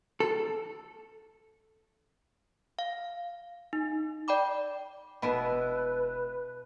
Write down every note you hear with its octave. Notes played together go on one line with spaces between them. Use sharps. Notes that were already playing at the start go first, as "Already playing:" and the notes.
A4
F5
D#4
D5 G5 B5 D6
E1 B2 B3 E4 B4